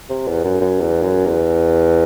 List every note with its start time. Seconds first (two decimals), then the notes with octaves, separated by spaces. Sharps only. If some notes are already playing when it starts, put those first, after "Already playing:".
0.09 C3
0.27 E2
0.44 F#2
0.61 F#2
0.79 E2
1.02 F#2
1.25 E2